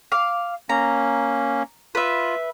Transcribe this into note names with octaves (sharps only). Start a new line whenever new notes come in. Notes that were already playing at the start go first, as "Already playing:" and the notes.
F5 D6
A#3 C#4 A#5
F4 B4 E5